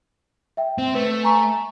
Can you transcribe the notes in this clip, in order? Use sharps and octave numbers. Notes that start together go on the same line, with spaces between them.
E5 G5
C4
A3 B4
G#5 A#5 C#6